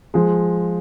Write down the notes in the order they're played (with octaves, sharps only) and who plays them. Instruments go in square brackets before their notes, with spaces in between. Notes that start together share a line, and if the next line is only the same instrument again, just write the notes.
[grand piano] F3 G#3